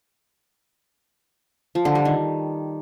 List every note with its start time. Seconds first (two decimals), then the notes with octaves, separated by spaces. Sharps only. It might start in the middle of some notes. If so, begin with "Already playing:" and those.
1.75 F3
1.85 D3
1.95 G3
2.05 D#3